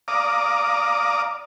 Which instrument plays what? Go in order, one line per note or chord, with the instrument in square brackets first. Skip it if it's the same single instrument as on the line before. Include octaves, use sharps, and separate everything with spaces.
[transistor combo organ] D5 F5 A#5 D6 D#6